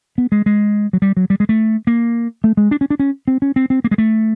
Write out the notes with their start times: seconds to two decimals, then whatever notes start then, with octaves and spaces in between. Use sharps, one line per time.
0.18 B3
0.32 G#3
0.46 G#3
0.93 F#3
1.02 G3
1.17 F#3
1.30 G3
1.40 G#3
1.49 A3
1.87 A#3
2.44 A3
2.57 G#3
2.71 D4
2.81 C#4
2.90 D4
3.00 C#4
3.28 C4
3.42 C#4
3.56 C4
3.70 C4
3.84 A#3
3.91 G#3
3.98 A3